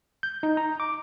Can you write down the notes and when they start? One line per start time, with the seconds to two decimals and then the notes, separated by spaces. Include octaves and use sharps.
0.23 G6
0.43 D#4
0.57 A#5
0.80 D6